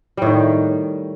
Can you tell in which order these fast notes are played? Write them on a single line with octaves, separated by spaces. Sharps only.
G3 A2 D#3